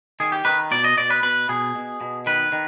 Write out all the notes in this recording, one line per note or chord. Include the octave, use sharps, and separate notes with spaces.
D#3 G#4
G4
D#3 B4
B2 D5
D#5
B2 D5
B4
B2 B4
B2 G#4
B2
B2
D#3 B4
D#3